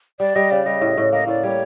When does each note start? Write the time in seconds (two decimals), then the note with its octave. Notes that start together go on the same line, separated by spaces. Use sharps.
0.20 G3 D5
0.36 G3 D#5
0.50 C#3 D5
0.66 G3 D#5
0.81 A2
0.97 A2
1.12 A#3 D#5
1.28 A2 D5
1.43 G3 C#5